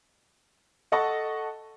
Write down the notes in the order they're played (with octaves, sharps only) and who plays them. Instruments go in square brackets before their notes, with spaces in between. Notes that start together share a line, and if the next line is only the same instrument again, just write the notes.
[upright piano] A4 D#5 F#5 A5 C#6